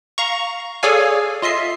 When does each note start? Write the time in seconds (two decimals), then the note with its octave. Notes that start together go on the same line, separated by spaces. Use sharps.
0.18 F5 A#5 C#6
0.83 G#4 A4 C#5 D5 F5 G#5
1.42 F4 D#5 E5 C7